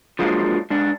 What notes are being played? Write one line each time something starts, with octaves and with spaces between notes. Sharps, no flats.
F3 F#3 G#3 A#3 D4 F4
G#2 D4